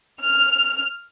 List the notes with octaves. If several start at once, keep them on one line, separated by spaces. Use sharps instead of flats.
F6